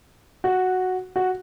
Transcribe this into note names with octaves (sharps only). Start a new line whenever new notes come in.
F#4
F#4